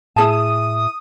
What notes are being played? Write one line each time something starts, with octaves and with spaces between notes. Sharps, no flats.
A2 E4 G#4 A5 D#6